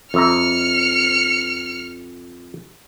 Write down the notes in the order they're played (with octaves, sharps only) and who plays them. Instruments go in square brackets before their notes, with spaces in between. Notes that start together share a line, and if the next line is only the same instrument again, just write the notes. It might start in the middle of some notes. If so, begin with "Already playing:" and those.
[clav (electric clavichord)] F2 E5 A#5 [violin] F6 C#7